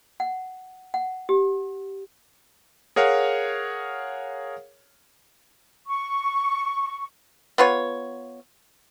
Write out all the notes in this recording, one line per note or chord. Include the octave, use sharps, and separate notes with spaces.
F#5
F#5
G4
G#4 A#4 C#5 F5 F#5
C#6
B3 F4 C#5